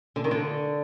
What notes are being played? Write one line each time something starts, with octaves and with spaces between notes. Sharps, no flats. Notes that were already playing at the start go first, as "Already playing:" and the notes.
D3
D#3
D3